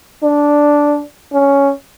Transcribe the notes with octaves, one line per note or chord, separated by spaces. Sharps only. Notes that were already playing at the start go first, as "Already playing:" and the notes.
D4
C#4